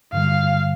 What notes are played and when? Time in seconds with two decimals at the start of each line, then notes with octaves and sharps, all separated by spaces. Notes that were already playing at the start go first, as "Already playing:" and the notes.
0.13 G2 D3 G3 F5